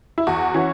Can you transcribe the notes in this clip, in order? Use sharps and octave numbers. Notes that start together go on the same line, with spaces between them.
E4
E2 F#4
E3 C#4